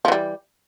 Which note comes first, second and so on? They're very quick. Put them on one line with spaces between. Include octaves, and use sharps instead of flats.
F3 E3 G3